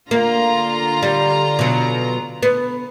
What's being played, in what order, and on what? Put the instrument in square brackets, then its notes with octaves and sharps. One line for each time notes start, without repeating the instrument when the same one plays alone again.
[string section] D3 F4 A#5 [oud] A#3
[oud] G3
B2 F#3
B3